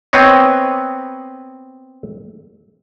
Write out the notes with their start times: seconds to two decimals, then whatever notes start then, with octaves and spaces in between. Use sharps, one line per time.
0.13 B3 C4 B4 C#5 D#5